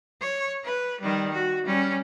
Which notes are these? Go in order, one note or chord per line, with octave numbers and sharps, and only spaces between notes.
C#5
B4
D#3 G3
F#4
G3 C#4